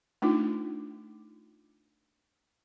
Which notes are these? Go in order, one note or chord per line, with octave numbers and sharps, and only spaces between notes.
A3 D4 D#4 F4